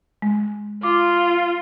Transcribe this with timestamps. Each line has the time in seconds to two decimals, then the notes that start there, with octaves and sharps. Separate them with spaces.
0.22 G#3
0.83 F4 D6